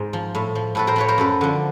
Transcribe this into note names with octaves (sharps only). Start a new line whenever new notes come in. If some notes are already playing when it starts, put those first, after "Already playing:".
Already playing: G#2 A#4 C5
F3
A2
F3
A2 A4 B4
A#4 C5
F3 B4 C#5
A#4 C5
F#2 A4 B4
D3 F3